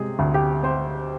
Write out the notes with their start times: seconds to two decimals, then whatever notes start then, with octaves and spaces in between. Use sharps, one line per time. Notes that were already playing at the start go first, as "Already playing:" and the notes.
Already playing: C3 G#3 G#4
0.19 D2
0.34 G4
0.63 C4 C5